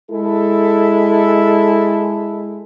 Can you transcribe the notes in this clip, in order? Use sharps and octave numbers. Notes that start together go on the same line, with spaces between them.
G#3 E4 A4